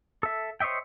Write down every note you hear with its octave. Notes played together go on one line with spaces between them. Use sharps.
A4 E5
C5 C#5 D#5 E5 G5